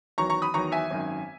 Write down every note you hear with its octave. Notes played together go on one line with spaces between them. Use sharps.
E2 D#3 F#3 A#5 C#6
A#5 C#6
B5 D#6
E2 D#3 F#3 A#5 C#6
E5 G#5
G#1 F#2 D#3